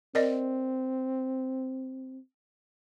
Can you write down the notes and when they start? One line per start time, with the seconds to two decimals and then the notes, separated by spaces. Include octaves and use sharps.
0.15 C4 A#4 D5 D#5